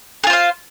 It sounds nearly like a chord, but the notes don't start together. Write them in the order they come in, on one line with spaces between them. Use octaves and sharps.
G#4 F4 C5 F5